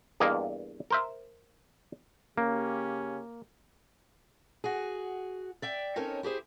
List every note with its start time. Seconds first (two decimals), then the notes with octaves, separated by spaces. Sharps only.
0.20 E2 G2 A#3 A#4 D#5
0.91 A#4 C5 E5
2.38 C#3 A#3 C#4 G4
4.64 F#4 G#4
5.62 D5 E5 G5
5.96 C4 C#4 D#4 A4 A#4 C#5
6.23 E4 G4 G#4 C5